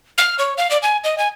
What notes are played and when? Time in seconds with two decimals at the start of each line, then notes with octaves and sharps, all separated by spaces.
0.18 F6
0.39 C#5
0.58 F5
0.71 D5
0.82 G#5
1.04 D#5
1.18 G#5